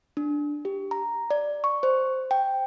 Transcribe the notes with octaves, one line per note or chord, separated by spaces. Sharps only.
D4
G4
A#5
D5
C#6
C5
G5